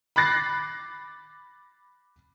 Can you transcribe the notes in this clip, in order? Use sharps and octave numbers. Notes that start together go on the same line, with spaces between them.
B5 D6 F#6 A6 A#6 C7